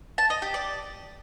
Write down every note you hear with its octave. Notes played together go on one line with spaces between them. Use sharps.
A5
D#5
G4
D5